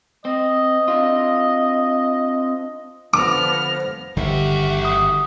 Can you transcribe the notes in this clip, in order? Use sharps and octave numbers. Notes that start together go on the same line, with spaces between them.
C4 D#5
C4 D4 F4
D3 F3 B3 D6 F6 A#6
G1 E2 D3 D#3 F#4 G4 E5
D#6